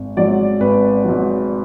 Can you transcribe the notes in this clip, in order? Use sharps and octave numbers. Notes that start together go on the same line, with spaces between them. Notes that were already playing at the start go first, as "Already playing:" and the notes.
Already playing: G#1
G#2 F#3 D5
G#1 B4
G#2 F#3